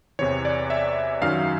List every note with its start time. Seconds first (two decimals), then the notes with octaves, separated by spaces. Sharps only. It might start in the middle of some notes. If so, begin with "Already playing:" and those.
0.19 E2 C3 E3 C#5
0.45 D5
0.70 E5
1.22 F#2 D#3 F#3 F5